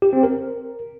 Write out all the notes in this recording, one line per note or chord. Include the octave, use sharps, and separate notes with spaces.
G4
C4
A#4